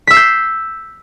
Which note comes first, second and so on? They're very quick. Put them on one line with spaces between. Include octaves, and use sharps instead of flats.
B6 E6 C7 G6